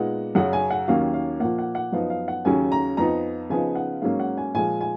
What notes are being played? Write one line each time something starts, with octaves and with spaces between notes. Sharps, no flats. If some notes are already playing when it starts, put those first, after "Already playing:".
Already playing: A#2 G#3 B3 D#4 F#5
F#2 C#3 F#3 C#4 F#5
G#5
F#5
D#2 D#3 F#3 A#3 C#4 F5
F5
A#2 F3 A#3 F#5
F#5
F#5
F#2 F3 B3 D#4 F5
F5
F#5
D#2 C#3 F#3 C#4 G#5
A#5
F2 F3 B3 D#4 A#5
C#3 F3 B3 D#4 G#5
F#5
G#2 F#3 A#3 C#4 F5
F#5
G#5
A#2 F3 G#3 G#5
G#5